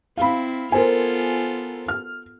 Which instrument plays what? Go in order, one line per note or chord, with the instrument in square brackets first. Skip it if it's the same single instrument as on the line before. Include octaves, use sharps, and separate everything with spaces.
[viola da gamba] C4 E4 [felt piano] F5 B5
[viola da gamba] B3 F4 A4 [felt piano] A#4 C5 G#5
[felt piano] F6